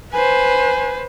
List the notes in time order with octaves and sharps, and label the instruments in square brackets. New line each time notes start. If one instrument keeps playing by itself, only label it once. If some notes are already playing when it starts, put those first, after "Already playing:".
[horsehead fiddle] B4 C5 [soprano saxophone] G#5